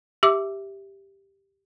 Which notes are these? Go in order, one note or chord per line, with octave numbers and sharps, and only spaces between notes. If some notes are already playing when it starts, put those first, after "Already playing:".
G4 E5 D6 E6